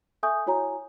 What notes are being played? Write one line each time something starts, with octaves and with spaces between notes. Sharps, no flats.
A4 E5 G#5 C#6 D#6 G6
E4 F#4 C#5 G#5 A#5